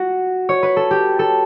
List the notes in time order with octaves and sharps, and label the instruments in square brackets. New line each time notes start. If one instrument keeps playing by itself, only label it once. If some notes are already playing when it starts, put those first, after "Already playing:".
Already playing: [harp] F#4
C#5
B4
A4
G4
A4